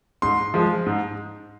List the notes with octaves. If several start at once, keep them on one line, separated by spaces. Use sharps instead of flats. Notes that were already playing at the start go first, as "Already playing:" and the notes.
G#2 C6
F3 G#3
G#2